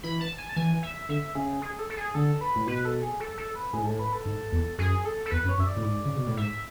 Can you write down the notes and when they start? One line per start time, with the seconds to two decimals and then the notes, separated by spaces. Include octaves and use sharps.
0.03 E3 B5
0.21 A5
0.38 G#5
0.49 A5
0.56 E3 G#5
0.83 E5
1.09 D3 E5
1.35 C#3 G#4
1.62 G#4
1.79 A4
1.90 A4
1.97 G#4
2.15 D3 A4
2.41 B4
2.56 A2
2.67 B2 B4
2.85 A4
3.03 G#4
3.20 A4
3.38 A4
3.55 B4
3.73 A2 G#4
3.81 G#2
3.86 A2 A4
3.99 B4
4.13 A4
4.26 G#2
4.52 E2
4.78 F#2 G#4
5.05 A4
5.26 A4
5.31 E2 B4
5.44 F#2
5.49 C#5
5.58 F#2 E5
5.67 D5
5.77 A2
5.84 G#2
6.05 C#3
6.16 B2
6.27 A2
6.37 G#2 E5